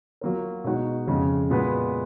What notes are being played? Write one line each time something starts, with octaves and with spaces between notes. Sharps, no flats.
F#3 A#3 F4 A#4
B2 G#3 D#4 F#4
F2 C#3 G#3
A#2 G#3 B3 F#4 B4